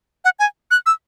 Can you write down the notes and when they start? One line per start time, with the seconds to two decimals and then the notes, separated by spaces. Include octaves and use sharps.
0.25 F#5
0.39 G#5
0.71 F#6
0.86 E6